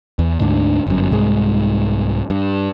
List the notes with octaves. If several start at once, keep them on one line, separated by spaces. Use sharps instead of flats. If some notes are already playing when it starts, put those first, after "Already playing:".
E2
D2 G#2 D3 D4
G1 F#2
C2 G#2 G#3
G2